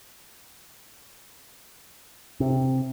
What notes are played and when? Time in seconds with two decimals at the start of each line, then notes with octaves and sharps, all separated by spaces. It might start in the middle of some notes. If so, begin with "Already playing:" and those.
2.40 C3